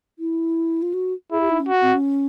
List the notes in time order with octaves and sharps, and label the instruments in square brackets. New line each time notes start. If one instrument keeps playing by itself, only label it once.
[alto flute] E4
F4
F#4
[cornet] E4 [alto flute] G#4
[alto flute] G4
D#4
C#4
[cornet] F#4
[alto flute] C4
C#4